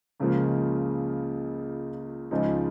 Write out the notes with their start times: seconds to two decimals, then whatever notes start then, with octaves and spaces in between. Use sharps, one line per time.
0.20 C#2 C#3 F3 A#3
2.31 C#2 C#3 F3 G#3 D#4